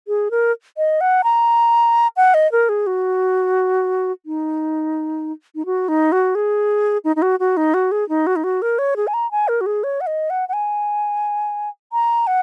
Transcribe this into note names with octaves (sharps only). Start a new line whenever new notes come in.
G#4
A#4
D#5
F#5
A#5
F#5
D#5
A#4
G#4
F#4
D#4
D#4
F#4
D#4
F#4
G#4
D#4
D#4
F#4
F#4
D#4
F#4
G#4
D#4
F#4
D#4
F#4
A#4
C#5
G#4
G#5
A#5
G#5
A#4
F#4
G#4
C#5
F#5
D#5
F#5
F#5
G#5
A#5
F#5